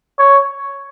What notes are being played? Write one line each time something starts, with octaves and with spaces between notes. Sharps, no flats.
C#5